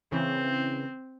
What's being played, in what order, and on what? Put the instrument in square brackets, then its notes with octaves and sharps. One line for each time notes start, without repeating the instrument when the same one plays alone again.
[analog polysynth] C#3 E3 [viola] C4